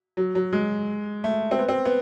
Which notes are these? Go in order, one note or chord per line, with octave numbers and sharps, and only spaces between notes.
F#3
F#3
G#3
A3
C4
B3
C4
B3